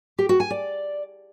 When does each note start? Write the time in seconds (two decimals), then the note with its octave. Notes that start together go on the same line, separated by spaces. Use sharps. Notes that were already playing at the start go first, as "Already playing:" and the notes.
0.19 G4
0.29 F#4
0.40 G#5
0.50 D5